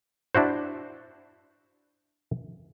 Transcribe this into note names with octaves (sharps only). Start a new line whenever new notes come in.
D4 E4 F#4 C5